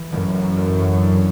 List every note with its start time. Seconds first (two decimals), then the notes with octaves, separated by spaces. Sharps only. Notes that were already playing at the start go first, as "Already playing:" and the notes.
Already playing: E3
0.12 A1 F#2
0.35 A1
0.57 A1
0.80 A2
1.02 D4